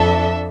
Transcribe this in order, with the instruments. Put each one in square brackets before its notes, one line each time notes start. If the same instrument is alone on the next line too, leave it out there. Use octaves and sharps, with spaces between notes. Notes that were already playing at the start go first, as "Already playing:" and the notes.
Already playing: [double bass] F2 [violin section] D4 A4 E5